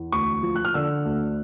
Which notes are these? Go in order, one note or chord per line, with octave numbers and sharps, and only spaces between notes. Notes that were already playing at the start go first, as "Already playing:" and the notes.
Already playing: E2
D2 C#6
F3
F#6
F6
D3 E6
D2